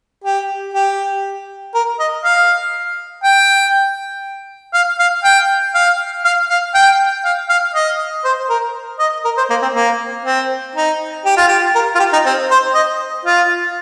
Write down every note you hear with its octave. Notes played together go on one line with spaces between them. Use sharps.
G4
G4
A#4
D#5
F5
G5
F5
F5
G5
F5
F5
F5
G5
F5
F5
D#5
C5
A#4
D#5
A#4
C5
A#3
C4
A#3
C4
D#4
G4
F4
G4
A#4
F4
G4
D#4
C4
C5
D#5
F4